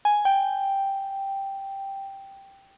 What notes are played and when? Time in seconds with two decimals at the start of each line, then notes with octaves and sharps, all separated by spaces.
0.05 G#5
0.25 G5